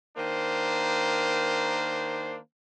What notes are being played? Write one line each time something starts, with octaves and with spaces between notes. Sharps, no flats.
D#3 A#3 D4 C5